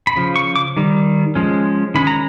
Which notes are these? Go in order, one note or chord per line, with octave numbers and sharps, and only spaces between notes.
B5
C#3 F3
C#6
D6
D#3 G3
F3 G#3 C#4
D#3 G#3 C#4 B5
A#5